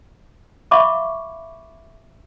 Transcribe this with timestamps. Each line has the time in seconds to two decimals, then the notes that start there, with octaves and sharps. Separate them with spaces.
0.71 E5 F5 B5 C#6 D6